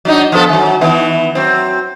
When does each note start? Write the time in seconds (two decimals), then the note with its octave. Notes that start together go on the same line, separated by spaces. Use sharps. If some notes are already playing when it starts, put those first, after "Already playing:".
0.05 F#3 D4 D#4
0.32 F3 B3 A4
0.49 D#3 F#3
0.81 D#3 E3 B3
1.35 F#3 C4